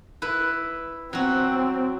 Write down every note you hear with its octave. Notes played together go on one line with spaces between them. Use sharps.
E4 B4
F#3 C4 F#4